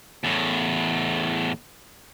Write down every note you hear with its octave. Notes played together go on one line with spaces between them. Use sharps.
E2 A2